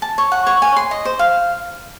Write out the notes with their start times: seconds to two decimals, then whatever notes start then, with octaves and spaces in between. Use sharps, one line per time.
0.02 A5
0.18 C#5
0.32 F#5
0.47 C#5
0.62 G#5
0.76 C6
0.91 D#5
1.05 C5
1.19 F5